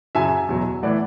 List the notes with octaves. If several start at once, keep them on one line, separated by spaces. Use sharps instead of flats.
F#2 C#3 F#3 E5 G#5
E2 B2 F#3
A2 E3 D5 F#5